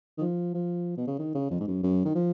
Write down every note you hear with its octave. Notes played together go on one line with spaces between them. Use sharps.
D#3
F3
F3
B2
C#3
D#3
C#3
F2
G#2
F#2
F#2
D#3
F3